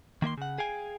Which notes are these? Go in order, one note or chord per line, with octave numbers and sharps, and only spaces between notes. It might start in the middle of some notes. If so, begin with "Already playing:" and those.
D#3 A#3 E5 C6
C#3 F#5
G#4 F5 G5 G#5